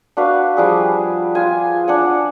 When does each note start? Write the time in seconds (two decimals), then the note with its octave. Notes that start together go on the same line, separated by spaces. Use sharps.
0.17 D4 F#4 B4 F5
0.57 F3 G3 G#4
1.35 F4 G#5
1.88 D4 F#5 G#5